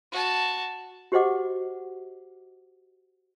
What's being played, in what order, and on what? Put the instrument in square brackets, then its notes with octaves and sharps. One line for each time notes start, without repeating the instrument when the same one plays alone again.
[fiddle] F#4 A5
[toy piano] F#4 G4 C5 D#5 F#5 D6